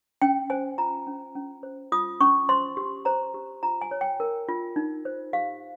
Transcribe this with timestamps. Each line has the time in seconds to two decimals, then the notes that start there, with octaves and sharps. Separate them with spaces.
0.22 C#4 G5
0.50 C5 G#5
0.78 F4 A#5
1.07 C#4
1.35 C#4
1.63 C5
1.92 F4 D#6
2.21 C#4 C#6
2.49 C5 C6
2.77 G4
3.05 C5 A#5
3.34 G4
3.63 F4 A#5
3.81 G#5
3.91 C#5
4.01 G5
4.20 A#4
4.49 F4
4.76 D#4
5.05 C5
5.33 G4 F5